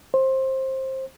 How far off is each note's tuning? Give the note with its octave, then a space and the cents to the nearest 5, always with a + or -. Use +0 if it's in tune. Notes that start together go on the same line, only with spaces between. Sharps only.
C5 +20